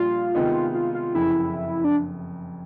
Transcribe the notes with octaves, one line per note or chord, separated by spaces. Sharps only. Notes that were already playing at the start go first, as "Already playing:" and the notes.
Already playing: A#1 A#2 G3 F4
C3 D#3 G#3 B3 D#4
F4
F4
F#1 F2 C#3 E4
D4